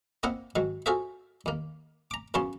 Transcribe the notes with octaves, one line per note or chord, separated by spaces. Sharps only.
A#3 C4 E4 D#5 F#5
G#2 D#3 F#3
F4 F#4 G#4 A4 C5 E5
D#2 A#3
A#5 D6
F#2 C#3 B3 C#5 A5 C6